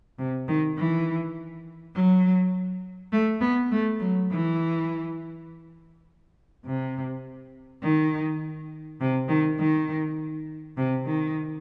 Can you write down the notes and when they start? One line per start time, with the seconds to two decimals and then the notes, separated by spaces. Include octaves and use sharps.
0.18 C3
0.48 D#3
0.77 E3
1.95 F#3
3.12 A3
3.41 B3
3.70 A3
4.00 F#3
4.30 E3
6.65 C3
7.83 D#3
9.00 C3
9.29 D#3
9.58 D#3
10.77 C3
11.06 D#3